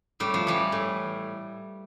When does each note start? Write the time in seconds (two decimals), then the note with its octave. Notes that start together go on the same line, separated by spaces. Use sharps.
0.20 A2 G3
0.34 F3
0.47 E3 G3
0.72 A2